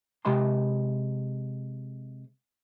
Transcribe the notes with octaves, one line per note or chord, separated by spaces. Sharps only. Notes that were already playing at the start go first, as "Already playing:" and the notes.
C3 G#3 G4 D#5 B5 C6